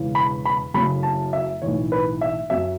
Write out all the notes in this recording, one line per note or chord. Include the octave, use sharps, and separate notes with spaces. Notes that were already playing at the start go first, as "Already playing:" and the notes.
Already playing: E1 E2 C#3
B5
B5
F#1 F#2 C#3 A3 C#4 B5
A5
E5
B1 A2 E3 C#5
B4
E5
F#2 F#3 C#4 E5